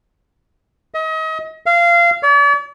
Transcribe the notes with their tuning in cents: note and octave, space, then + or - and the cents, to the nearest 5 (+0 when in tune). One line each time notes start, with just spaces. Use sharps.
D#5 +35
F5 -20
D5 -45